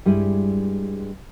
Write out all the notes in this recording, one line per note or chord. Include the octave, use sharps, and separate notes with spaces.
G2 G3 G#3 E4 G#5